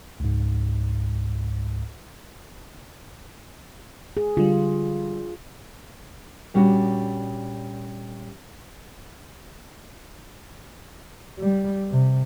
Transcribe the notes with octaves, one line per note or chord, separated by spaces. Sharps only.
C#2 G#2
G#4
D3 G3 F4
A#2 G3 C#4 D4 F#4
G3
C3